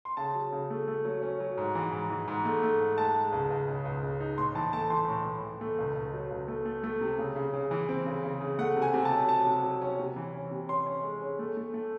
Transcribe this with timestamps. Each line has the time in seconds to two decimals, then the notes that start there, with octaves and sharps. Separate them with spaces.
0.05 C6
0.17 C#3 A5
0.35 F#3
0.52 C#3
0.70 A3
0.88 A3
1.05 F#3
1.22 C#4
1.40 F#3
1.57 G#2
1.75 E3
1.92 G#2
2.10 E3
2.28 G#2
2.45 A3
2.63 A3
2.80 G#2
2.98 G#3 A5
3.15 G#3
3.32 C#2
3.50 C#2
3.68 C#3
3.85 C#2
4.03 C#3
4.20 D#4
4.38 A2 C6
4.55 E3 A5
4.73 A3 A5
4.90 E3 C6
5.08 A2
5.26 A2
5.43 E3
5.61 A3
5.78 C#2
5.96 C#2
6.13 F#3
6.31 C#2
6.48 A3
6.65 A3
6.84 A3
7.01 C3
7.18 C#3
7.36 C#3
7.54 C#3
7.71 E3
7.89 C4
8.07 C#3
8.24 C#3
8.41 C#3
8.59 A3 F#5
8.77 C3
8.82 G#5
8.94 C3
9.05 A5
9.11 F#3
9.29 F#3 A5
9.47 C3
9.64 F#3
9.82 C#4
9.99 C3
10.16 E3
10.34 C#4
10.51 C3
10.69 C#4 C6
10.86 C#4
11.04 G#3
11.21 C#4
11.39 A3
11.57 A3
11.74 A3